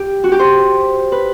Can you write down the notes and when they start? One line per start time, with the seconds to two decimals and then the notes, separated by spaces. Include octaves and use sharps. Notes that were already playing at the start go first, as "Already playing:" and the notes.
Already playing: G4
0.24 F#4
0.32 G4
0.39 C5
1.12 B4